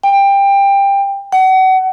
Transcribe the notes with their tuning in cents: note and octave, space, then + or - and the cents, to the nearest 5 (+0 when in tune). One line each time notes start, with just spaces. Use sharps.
G5 +20
F#5 +30